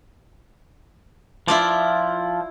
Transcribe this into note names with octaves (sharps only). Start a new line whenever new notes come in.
F3 E4 F4 D5